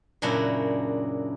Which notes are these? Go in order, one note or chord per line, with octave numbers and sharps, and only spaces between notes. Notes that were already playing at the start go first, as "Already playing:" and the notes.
F#2 A#2 C#3 D4 E4 F#4